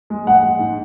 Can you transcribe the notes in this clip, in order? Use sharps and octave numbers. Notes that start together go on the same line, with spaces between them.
G#3
G#3 F#5
G#3
G#2